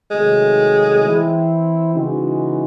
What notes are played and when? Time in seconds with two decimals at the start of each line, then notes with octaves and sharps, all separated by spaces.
0.11 C3 D#3 F#3 G#3 A3
1.03 E3 C4 E4
1.93 C#3 E3 G#3 D#4 F#4